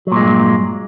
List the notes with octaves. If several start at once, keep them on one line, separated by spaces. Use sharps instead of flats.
G2 A#2 F#3 G#3